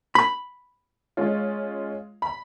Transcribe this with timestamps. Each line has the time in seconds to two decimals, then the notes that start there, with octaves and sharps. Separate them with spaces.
0.15 B5
1.17 G#3 C#4 F4
2.22 B5